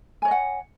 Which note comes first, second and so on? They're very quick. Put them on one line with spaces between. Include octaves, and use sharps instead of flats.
G#5 C#5 D#5 F#5